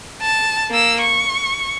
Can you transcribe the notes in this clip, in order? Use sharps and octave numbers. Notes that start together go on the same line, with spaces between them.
A5
A#3 E6
C#6